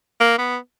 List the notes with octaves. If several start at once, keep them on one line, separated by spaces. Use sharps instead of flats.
A#3
B3